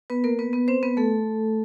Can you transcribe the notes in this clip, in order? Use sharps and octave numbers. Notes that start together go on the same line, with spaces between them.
B3 B4
A#3 A#4
B3 B4
B3 B4
C4 C5
B3 B4
A3 A4